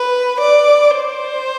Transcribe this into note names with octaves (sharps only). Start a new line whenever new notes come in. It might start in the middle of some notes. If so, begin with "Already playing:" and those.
Already playing: B4
D5
C5